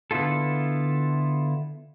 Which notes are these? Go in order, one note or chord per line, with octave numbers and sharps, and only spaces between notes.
D3 B3 E4 F4 A4